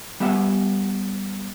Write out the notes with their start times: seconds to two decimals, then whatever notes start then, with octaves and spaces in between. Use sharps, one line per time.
0.20 G3 B3 G4 E5 F#5